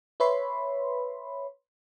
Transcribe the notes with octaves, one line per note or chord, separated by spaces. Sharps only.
B4 C#5 E5 B5 C6